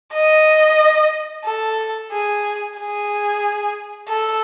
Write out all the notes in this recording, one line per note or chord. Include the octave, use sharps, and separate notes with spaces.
D#5
A4
G#4
G#4
A4